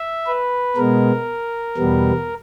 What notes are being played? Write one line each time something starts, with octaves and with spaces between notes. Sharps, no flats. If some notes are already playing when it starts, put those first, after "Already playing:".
Already playing: E5
B4
B2 G#3 B3 A#4
E2 B2 G3 B3